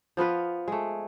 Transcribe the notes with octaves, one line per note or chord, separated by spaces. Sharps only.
F3 B3 F4 B4
G#3 A3